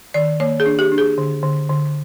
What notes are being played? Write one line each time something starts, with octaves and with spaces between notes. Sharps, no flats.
D#3 D5
A#3 C#5
G#4
D4
G4
D4
G#4
D3
D3
D3